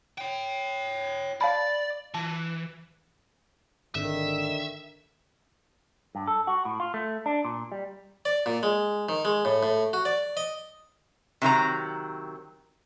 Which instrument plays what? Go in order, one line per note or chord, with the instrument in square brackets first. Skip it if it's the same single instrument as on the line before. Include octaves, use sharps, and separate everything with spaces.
[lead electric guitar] C#5 G5
[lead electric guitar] D5 [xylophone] F5 A5 B5
[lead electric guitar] E3 [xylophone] A5
[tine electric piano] G#1 [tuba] D3 [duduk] D#3 [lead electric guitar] E5
[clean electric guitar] G2
A4
F#4
A2
F4
A3
D4
A#2
G3
[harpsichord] D5
A#2
G#3
D#3
G#3
A2
A2
F#4
D5
D#5
[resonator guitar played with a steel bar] C3 D#3 F#3 A#5